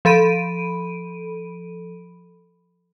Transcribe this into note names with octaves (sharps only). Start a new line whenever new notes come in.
F3 A4 B5 D7 D#7